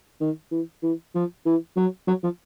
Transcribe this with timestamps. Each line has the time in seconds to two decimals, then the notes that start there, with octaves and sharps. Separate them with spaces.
0.21 D#3
0.51 E3
0.83 E3
1.15 F3
1.46 E3
1.77 F#3
2.08 F#3
2.23 F3